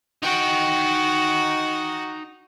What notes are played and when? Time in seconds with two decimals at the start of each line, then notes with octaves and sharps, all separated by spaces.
0.23 D#4 F#4 G5